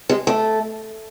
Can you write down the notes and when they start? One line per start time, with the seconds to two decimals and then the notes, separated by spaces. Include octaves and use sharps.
0.09 G#3
0.27 A3